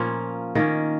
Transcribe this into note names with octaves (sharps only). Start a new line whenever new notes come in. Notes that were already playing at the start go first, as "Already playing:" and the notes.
Already playing: A#2 F3 A#3 C#4
D#3 A#3 C#4